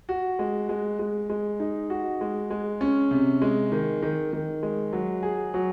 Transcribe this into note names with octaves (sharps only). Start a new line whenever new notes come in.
F#4
G#3
G#3
G#3
G#3
D#4
F#4
G#3
G#3
C#4
C3
G#3
D#3
D#3
D#3
G#3
F#3
G#4
F#3